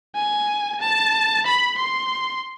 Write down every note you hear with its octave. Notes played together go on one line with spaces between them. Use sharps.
G#5
A5
B5
C6